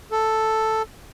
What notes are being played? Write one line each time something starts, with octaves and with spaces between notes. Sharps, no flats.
A4